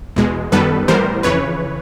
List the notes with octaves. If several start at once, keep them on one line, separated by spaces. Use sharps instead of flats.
E2 B2 G#3
F#2 D#3 G3 B3 A4 B4
A2 E3 G3 B3 A#4 C5
F2 C#3 E3 B4 C#5